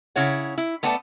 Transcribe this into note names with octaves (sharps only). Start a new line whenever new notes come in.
C#3 E4 C#5 F#5
E4
A3 B3 A4 D5 F#5 A5